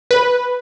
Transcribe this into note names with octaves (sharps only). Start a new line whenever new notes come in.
B4